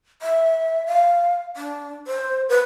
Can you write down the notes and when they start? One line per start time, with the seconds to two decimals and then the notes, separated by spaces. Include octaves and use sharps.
0.22 E5
0.87 F5
1.57 D4
2.07 C5
2.49 B4